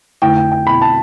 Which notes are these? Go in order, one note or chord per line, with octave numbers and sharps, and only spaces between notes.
F2 D3 A3 E4 G5
G5
G5
B2 B3 E4 B5
A5